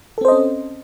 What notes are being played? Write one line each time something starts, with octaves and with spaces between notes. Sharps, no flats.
C4 C#4 A4 C5 D#5